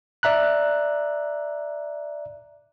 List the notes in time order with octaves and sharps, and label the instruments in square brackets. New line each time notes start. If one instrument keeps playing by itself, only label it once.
[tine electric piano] D5 E5 A#5 F#6